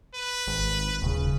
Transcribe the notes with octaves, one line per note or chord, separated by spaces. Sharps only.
B4
G#1
D#1 C#3